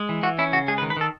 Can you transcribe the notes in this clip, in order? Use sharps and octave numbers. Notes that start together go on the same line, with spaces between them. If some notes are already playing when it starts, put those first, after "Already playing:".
Already playing: G#3
E3
E3 F#4
C#4 E4
C#3 F#4
G#3 G#4
B4
D#3
B4
D#3 A4